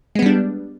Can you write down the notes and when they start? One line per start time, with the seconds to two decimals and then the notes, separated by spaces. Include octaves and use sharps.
0.15 G#3
0.19 B3
0.22 G3
0.26 D4